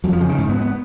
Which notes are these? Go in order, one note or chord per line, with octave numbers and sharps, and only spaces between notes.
F2 F#3
F3
C#3
D#3
G#2
B3
B3